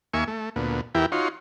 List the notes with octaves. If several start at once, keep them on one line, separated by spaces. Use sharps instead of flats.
D#2 A#3 E5 G#5 C#6
A3
D2 A#2 B3
E2 E3 E4 G4 A#4 G5
D#4 F4 F#4 C#5 C6